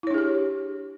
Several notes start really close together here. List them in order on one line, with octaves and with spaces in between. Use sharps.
E4 C#5 D4 G#4 G4